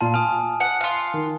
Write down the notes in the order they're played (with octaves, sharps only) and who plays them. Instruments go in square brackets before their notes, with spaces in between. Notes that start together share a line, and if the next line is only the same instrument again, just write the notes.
[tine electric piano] A#2 F4 F5 [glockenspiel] A5
[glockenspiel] G#5 D#6 [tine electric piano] F6
[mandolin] F#5
F4 F5
[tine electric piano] D#3